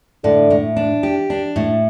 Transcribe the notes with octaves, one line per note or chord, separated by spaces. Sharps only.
A2 D3
A2
D4
G4
D4
A2